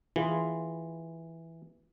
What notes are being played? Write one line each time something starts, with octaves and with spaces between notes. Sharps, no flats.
E3 F4 G#4 B4